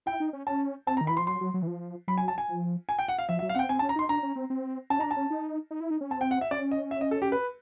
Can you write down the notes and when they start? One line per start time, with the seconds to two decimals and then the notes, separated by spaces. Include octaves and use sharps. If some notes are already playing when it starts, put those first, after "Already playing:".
0.06 E4 G5
0.20 D#4
0.33 C#4
0.47 C#4 A5
0.87 C4 A5
0.97 A#5
1.01 D#3
1.07 E3 B5
1.17 F3 C6
1.27 F#3 C6
1.41 F#3
1.54 F#3
1.62 E3
1.67 F3
2.08 F#3 B5
2.18 G#5
2.28 A5
2.38 G#5
2.48 F3
2.89 G#5
2.99 G5
3.08 F#5
3.19 F5
3.29 F3 E5
3.39 E5
3.42 F#3
3.49 F5
3.55 C4 F#5 G5
3.69 C4 G#5
3.79 A5
3.82 C#4
3.89 A#5
3.96 D#4 C6
4.09 D4 A#5
4.23 C#4
4.36 C4
4.50 C4
4.90 C#4 A5
4.99 D4 D#4 A#5
5.11 A5
5.17 C#4
5.30 D#4
5.71 D#4
5.80 E4
5.90 D#4
6.01 C#4
6.11 C4 A5
6.21 G5
6.31 F#5
6.41 E5
6.51 C#4 D5
6.71 D#5
6.91 E5
7.01 D#5
7.11 A4
7.22 G4
7.32 B4